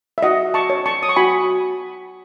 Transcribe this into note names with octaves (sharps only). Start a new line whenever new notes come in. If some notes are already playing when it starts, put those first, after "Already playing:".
E5
F#4 D#5 F#5
A5 C#6
C#5
A5 C#6
D#6
C#6
F#4 G#5 B5